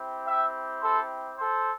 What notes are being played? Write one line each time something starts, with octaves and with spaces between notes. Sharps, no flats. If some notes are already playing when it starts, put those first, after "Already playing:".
Already playing: C4 E4 G4
E5 G5
A4 C5
A4 C5